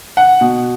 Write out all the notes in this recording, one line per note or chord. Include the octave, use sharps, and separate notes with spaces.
F#5
B2